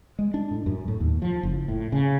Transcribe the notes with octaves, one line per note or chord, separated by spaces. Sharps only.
G#3
D4
A2
F#2
A2
D#2
F3
F#1
A2
C#3